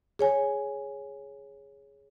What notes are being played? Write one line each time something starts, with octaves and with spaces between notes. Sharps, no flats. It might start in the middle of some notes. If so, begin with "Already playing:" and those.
G#4 C#5 G#5